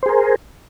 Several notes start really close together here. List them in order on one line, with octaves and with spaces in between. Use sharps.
C5 G#4 A#4